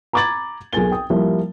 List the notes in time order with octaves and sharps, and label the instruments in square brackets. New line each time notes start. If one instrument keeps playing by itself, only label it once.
[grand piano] A#5 B5 D6 G#6 A6 F#7
B1 G#4 A#4 G#5 A6 G7
G5 D#6
F3 G3 A#3 E4